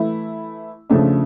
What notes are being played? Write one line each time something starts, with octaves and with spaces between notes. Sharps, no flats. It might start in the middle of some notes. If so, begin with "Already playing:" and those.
Already playing: E3 A3 E4
C#3 F3 A3 D4